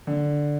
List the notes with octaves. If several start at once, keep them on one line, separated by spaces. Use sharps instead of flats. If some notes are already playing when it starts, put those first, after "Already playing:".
D3